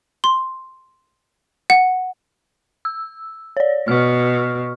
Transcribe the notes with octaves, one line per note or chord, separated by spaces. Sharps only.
C6
F#5
E6
C#5 D5
B2 C#6 F6